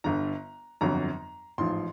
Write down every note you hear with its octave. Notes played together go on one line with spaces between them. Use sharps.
G1 G2 D3 A#5
G1 F2 D3 F#3 A#5
A1 G#2 F3 C6